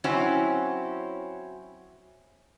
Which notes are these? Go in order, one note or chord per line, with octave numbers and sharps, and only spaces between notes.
F#3 C4 C#4 E4